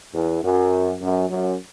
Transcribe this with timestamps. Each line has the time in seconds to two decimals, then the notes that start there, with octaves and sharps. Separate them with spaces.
0.14 E2
0.43 F#2
1.01 F#2
1.29 F#2